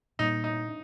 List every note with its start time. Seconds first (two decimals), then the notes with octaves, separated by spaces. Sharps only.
0.19 A#2 G3 A#3 D#4
0.44 D#4
0.69 D4